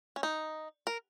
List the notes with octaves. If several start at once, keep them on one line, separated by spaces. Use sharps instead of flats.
C#4
D#4
A#4